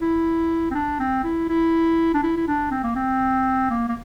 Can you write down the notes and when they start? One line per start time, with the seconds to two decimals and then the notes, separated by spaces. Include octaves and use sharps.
0.01 E4
0.71 C4
0.75 D4
1.00 C4
1.24 E4
1.49 E4
2.14 D4
2.23 E4
2.37 E4
2.48 D4
2.71 C4
2.83 A#3
2.96 C4
3.70 A#3
3.89 A#3